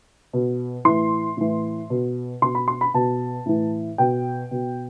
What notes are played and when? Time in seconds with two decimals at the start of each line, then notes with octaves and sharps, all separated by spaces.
0.33 B2
0.85 A2 E3 C6
1.37 A2 E3
1.90 B2
2.42 B2 C6
2.55 B5
2.68 C6
2.81 B5
2.94 B2 A5
3.46 A2 E3
3.98 B2 G5
4.51 B2